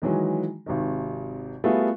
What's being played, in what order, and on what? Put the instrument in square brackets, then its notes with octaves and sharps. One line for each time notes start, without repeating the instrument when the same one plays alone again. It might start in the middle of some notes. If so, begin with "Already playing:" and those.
[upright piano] D#3 E3 F#3 G#3
G#1 C3 D#3
G3 A3 B3 F4 F#4 G#4